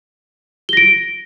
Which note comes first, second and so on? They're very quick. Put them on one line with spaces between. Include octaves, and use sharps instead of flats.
G7 A#6 D7